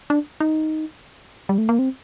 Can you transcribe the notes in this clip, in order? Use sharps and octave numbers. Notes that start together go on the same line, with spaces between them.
D4
D#4
G3
A3
A#3
C4